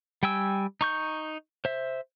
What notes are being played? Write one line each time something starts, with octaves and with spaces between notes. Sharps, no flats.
G3 G5 G#5 E6
D#4 C#6 G6
C5 E5